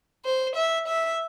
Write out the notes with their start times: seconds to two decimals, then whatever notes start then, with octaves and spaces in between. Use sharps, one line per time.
0.25 C5
0.56 E5
0.88 E5